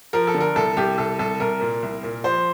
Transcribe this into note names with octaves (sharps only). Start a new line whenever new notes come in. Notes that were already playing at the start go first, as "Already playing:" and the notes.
F3 A#4
A4
D3
A#4
C2 A4
C2 G4
C2 A4
C2 A4
C2 A#4
A#2
C2
A#2
F3 C5